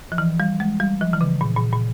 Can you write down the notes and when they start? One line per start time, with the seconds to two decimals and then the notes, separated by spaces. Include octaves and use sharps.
0.12 F3
0.18 E3
0.40 G3
0.60 G#3
0.80 G3
1.01 F3
1.13 E3
1.21 C#3
1.41 A#2
1.57 A#2
1.72 A#2